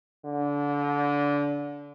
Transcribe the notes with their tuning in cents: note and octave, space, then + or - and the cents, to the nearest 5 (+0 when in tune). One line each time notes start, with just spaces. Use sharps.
D3 -25